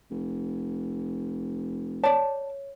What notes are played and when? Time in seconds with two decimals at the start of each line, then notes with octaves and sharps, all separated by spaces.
0.10 F1
2.04 C#5 D5 A5